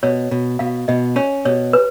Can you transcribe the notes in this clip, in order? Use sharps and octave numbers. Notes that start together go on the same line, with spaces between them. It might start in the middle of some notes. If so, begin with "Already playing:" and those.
B2 C#5
B2
B2 F5
B2 D#5
C#4 C#5
B2 C#5
B4